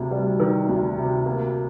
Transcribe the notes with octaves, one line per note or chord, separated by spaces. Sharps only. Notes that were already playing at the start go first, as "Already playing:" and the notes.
Already playing: D2 C3
G3
D#3
D2
C3
A#3